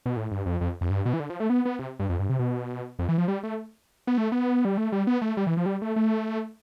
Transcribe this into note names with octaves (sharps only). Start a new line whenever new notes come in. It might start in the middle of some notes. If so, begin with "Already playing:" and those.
B2
A2
G2
F2
F2
F2
G2
B2
E3
D3
F3
A3
B3
B3
C3
G2
F2
G2
C3
B2
F2
E3
F3
G3
A3
B3
A3
B3
G3
A3
G3
B3
A3
G3
E3
F3
G3
A3
A3